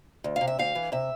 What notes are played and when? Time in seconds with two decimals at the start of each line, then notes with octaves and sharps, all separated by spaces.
0.24 D2
0.36 F5
0.41 C3
0.48 E5
0.59 D2 F5
0.75 E3
0.92 C3 E5